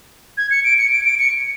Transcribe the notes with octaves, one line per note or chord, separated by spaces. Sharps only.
G#6
C#7
D7
C#7
D7
D7
C#7